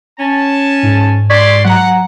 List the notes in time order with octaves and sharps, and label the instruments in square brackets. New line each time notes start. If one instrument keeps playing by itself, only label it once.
[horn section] C#4 A5
[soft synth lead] G#2
[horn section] D5 C6 [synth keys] C#6 G#6 B6
[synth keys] F#3 A#5 [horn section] F#5